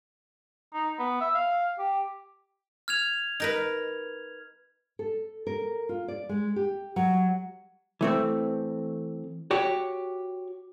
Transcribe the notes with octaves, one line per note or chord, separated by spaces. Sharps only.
D#4
B3
E5
F5
G4
F6 G#6 F7
D#4 A#4 B4
A4
A#4
F4
D5
G#3
G4
F#3
E3 A3 C4
F#4 G4 C#5